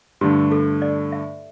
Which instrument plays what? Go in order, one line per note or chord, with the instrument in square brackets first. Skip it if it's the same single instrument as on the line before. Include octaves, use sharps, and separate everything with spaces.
[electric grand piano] G2 D3 A3 D4 [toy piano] G4
[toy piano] A4
D5
E5